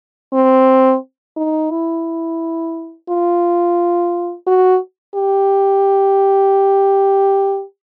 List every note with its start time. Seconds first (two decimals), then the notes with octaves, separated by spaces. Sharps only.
0.33 C4
1.37 D#4
1.71 E4
3.09 F4
4.47 F#4
5.15 G4